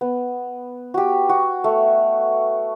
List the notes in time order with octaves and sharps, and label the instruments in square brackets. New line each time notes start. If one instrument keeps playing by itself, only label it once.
[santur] B3
F#4 G4
F#4
A3